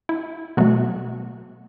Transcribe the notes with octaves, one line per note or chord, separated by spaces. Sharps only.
E4
B2 F#3 A3 F#4